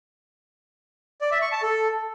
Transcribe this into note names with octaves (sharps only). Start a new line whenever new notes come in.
D5
E5
C#6
A5
A4